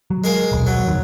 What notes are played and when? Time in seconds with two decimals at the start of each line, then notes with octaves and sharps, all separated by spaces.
0.11 F#3
0.24 G#3 A#4 F5
0.52 D#1 B1
0.67 F#3
0.87 F2 D#3